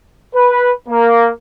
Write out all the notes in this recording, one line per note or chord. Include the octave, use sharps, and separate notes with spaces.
B4
A#3